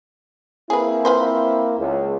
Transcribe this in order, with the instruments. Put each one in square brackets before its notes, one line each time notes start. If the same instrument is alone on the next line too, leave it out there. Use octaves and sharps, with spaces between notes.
[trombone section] A#3 C4 E4 [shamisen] G#4 B4
[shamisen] F4 B4 C5
[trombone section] C#2